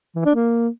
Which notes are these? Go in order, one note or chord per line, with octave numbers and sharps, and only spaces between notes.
E3
D4
A#3